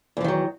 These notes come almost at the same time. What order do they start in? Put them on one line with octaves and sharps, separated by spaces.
E2 F3 D#3 F#3